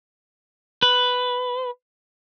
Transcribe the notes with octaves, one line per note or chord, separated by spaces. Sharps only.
B4